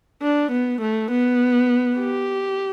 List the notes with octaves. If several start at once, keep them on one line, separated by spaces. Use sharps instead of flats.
D4
B3
A3
B3
G4